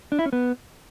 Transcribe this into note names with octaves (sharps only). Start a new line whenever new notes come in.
D4
E4
C#4
B3